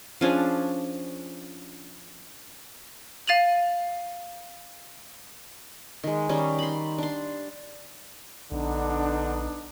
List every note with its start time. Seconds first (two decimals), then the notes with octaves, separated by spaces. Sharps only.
0.21 F3 C#4 D4 G#4
3.27 F5 A6 D#7 F7 F#7
6.04 D#3 G#3
6.29 D#3 G3 C#4 D#4
6.59 B5 C6
6.98 D4 C6
8.52 A#1 D3 B3 D4 D#4